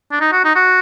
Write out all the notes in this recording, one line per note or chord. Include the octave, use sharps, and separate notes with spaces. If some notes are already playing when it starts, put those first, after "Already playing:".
D4
D#4
F#4
D#4
F#4